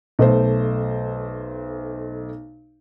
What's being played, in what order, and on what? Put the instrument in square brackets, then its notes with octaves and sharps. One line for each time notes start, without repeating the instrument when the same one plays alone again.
[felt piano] B1 A3 C5